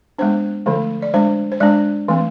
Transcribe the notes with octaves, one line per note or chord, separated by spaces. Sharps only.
G#3 B3 D4 C5
D3 F3 A3
D5
G#3 D4 C5
C5
G#3 D4 D5
E3 A3 C4